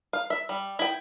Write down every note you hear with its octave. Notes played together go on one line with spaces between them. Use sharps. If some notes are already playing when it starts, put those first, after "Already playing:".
F5
E5
G3
E4 G5